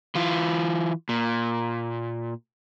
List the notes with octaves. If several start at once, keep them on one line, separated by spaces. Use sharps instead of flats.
E3 F4
A#2